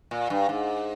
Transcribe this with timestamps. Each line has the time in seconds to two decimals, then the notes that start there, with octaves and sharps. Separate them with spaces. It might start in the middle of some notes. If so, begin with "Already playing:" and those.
0.11 A#2
0.30 G2
0.49 G#2